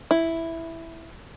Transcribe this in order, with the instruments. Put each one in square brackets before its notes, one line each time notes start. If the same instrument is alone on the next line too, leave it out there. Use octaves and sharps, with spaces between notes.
[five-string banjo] E4